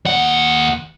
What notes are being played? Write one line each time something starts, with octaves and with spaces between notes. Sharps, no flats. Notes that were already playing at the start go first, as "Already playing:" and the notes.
D#2 F#5